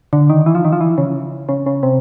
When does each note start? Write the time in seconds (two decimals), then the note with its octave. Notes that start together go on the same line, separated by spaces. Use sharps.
0.13 D3
0.30 D#3
0.46 E3
0.55 F3
0.65 D#3
0.72 F3
0.81 E3
0.98 C#3
1.49 C#3
1.66 C#3
1.83 C3